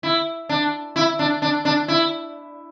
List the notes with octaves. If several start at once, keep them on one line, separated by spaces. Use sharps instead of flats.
E4
D4
E4
D4
D4
D4
E4